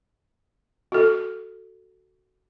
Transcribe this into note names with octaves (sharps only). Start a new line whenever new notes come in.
F#4 A4